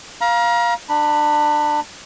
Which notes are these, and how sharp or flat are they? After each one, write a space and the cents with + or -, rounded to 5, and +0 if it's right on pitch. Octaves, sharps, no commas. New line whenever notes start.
F5 +0 A#5 +35
D4 +25 B5 -10